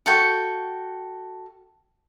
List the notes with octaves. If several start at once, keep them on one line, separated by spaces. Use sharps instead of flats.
F#4 A4 G5 C#6